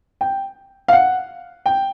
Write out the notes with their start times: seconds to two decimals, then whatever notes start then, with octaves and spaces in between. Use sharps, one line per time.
0.21 G5
0.88 F5
0.93 F#5
1.66 G5